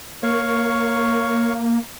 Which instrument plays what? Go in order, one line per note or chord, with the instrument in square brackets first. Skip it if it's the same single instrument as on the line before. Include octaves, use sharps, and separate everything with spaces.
[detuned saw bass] A#3 [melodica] C#5 F5 C#6